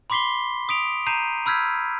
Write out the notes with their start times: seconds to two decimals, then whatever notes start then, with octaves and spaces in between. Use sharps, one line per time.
0.10 B5 C6 D6 B6 C7 G7
0.69 D#6 B6 D7 F7
1.06 A#5 G6 C7 D#7 F7
1.46 B5 E6 F6 G6 G#6 B6